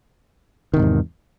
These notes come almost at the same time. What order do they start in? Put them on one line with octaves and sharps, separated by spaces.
D#3 C3 G#2 E2